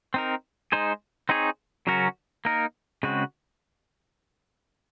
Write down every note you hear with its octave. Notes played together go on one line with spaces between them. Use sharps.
C4 D#4 A#4
G#3 D#4 G#4 C5
C4 D#4 G#4 C#5
C#3 F#3 C#4 F#4 A#4
A#3 D#4 A#4
C#3 G#3 C4 F#4